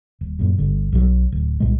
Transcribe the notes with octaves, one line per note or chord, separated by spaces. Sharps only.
D#1
F#2 A#2
G1 D3
B1 B2 F#3
D1
C2 A#2 G#3